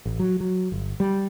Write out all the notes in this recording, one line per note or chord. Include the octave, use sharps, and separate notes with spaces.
A1
F#3
F#3
G1
G3